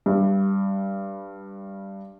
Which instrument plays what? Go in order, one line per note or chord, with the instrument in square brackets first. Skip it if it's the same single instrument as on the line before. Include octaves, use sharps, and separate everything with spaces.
[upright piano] G2 G3